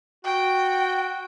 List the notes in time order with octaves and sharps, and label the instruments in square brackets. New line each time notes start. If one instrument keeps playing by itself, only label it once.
[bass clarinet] F#4 [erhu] G5